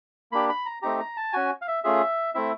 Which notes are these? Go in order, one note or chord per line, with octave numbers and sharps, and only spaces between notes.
A#3 D4 G4 B5
B5
A#5
A3 C4 D#4 G4 A#5
A#5
A5
C#4 F#4 G#5
F5
E5
A3 C#4 F4 G#4 E5
A3 C4 E4 E5